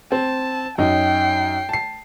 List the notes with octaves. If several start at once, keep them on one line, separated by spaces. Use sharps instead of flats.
C4 A5
F#2 D#4 G5 C7
A5 C7